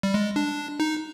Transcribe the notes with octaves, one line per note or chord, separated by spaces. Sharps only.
G3
G#3
D4
D#4